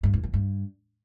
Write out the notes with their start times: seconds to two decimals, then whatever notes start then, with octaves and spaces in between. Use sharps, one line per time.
0.03 G2
0.13 E2
0.24 F3
0.34 G2